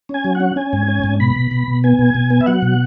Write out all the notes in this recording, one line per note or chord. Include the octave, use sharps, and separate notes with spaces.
C#4 G#5
F#3
F#5
C#4
C#4 G#5
G#2
C#4
G#2
B2 B5
B2
B2
B2
B3 G#5
B2
B2
B3
E5
F#3 F#5
B2